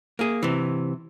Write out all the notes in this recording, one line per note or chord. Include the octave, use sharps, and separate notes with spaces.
A#3 G#4
C3 E3